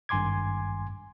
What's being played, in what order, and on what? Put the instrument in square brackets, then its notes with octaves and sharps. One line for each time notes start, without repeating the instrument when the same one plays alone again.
[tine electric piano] G#1 G2 G#5 C6 D6 G#6